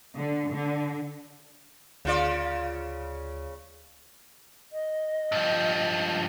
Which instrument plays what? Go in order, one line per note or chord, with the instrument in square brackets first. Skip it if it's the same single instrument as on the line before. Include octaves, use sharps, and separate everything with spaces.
[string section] D3
D3
[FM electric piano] D2 [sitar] C#3 F4 D5
[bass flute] D#5
[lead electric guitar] G2 F3